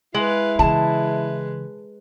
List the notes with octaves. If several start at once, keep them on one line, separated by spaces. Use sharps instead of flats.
G#3 E4 B4 F5
C#3 E3 G#3 B4 A5